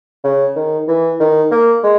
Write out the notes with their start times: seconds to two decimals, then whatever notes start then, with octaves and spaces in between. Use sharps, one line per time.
0.24 C#3
0.56 D#3
0.88 E3
1.20 D#3
1.51 A#3
1.83 G#3